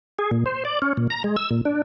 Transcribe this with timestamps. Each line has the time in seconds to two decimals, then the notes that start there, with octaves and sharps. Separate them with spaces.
0.19 G#4
0.31 A#2
0.46 C5
0.65 D5
0.82 C#4
0.97 A#2
1.10 A#5
1.24 G#3
1.36 E6
1.51 A#2
1.65 D4